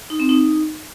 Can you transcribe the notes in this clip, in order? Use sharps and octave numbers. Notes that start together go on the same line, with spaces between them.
D#4
C4
D#4